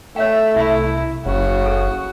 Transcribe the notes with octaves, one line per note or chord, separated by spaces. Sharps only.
A3 C#5 E5 G5
C2 E4 E5 B5
F#1 C#3 F#4
A4